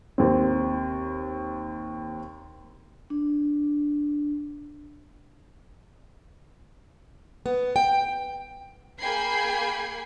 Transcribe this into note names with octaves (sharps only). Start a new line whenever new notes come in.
D#2 C4
D4
B3
G5
A#3 G#4 G5 B5 G#6 C7